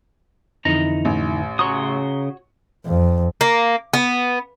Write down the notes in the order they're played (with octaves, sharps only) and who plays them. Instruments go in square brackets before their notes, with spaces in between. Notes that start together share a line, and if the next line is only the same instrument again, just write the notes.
[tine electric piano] F2 D3 [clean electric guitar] E3 D#4 A#5
[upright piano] A1
[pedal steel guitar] C#3 C6 D#6 [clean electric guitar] F#4 C#5 [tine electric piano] A#5
[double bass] F2
[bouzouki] A#3
B3